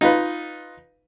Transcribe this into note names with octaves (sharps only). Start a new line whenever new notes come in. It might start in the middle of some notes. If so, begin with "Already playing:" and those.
D#4 F4 B4